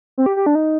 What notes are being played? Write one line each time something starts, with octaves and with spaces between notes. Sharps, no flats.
C4
G4
G4
D4
D#4